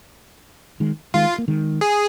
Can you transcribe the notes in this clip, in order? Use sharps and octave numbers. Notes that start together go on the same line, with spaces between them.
D#3 G#3
D#3 G#3 F4
A#3
D#3 G#3
G#4